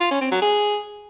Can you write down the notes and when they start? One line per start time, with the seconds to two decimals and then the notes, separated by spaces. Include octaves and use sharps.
0.01 F4
0.11 C#4
0.21 C4
0.31 F#3
0.42 G#4